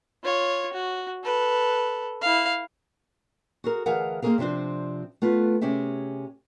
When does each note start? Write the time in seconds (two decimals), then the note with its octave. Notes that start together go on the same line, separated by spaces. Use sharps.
0.24 F4 C#5
0.73 F#4
1.24 A4 B4
2.21 E4 F5
3.64 F#4 G#4 A#4
3.86 D2 E3 G#4 A#4 F5 F#5
4.22 A#3 C4 F#4 G#4 A#4 F5
4.38 C3 F3 C4 D4 C5
5.22 A3 B3 F4 B4
5.61 C3 C#4 G4 G#4 E5